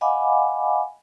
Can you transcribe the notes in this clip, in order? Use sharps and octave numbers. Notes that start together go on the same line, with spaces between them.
D#5 F5 F#5 G#5 B5 D6